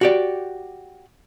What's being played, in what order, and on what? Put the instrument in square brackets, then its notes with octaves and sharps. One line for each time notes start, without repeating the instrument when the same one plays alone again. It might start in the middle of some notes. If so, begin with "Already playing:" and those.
[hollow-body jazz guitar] F#4 G4 D5